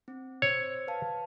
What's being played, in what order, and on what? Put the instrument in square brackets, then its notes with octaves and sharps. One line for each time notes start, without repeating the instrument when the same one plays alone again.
[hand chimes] C4
[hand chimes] C5 E6 [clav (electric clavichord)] C#5
[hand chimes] B4 F5 A5